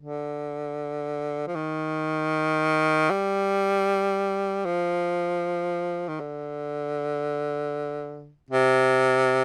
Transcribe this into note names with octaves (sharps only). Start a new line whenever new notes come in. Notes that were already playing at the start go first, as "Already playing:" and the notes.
D3
F3
D#3
G3
F3
D#3
D3
C3